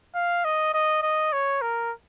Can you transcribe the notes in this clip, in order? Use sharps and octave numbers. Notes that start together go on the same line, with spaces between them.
F5
D#5
D#5
D#5
C#5
A#4